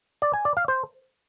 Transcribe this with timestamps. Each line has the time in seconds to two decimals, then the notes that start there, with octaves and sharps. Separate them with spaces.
0.22 D5
0.34 G#5
0.45 D5
0.57 F5
0.68 C5